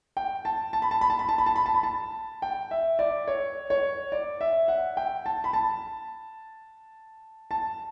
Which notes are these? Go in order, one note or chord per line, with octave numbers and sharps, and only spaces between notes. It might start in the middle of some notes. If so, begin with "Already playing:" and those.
G5
A5
A5
B5
A5
B5
A5
B5
A5
B5
A5
B5
A5
B5
A5
G5
E5
D5
C#5
C#5
D5
E5
F#5
G5
A5
B5
A5
A5